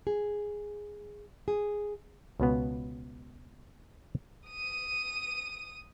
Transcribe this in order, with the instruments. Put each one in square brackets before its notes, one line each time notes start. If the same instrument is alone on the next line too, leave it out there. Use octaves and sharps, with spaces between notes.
[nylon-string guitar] G#4
G#4
[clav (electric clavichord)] C#2 B2 B3
[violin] D#6 D#7